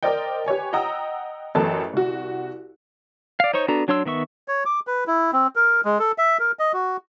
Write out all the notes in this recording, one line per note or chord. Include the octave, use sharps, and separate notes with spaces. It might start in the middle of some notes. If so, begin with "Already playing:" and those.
A#4 C5 D5 D#5 G5
G4 B4 C#5 G#5
D#5 F#5 G5 A#5 D#6 E6
A1 F#2 A4 B4 A5
C2 F#4
D5 F5
D#4 C5 C#5 C#6
B3 D4 F#4 A4 A#5
F#3 D4 C#5 C6 E6
D#3 B3 E5 C#6
C#5
D6
B4
E4
C4
A#4
G#3
A4
E5
A#4
D#5
F#4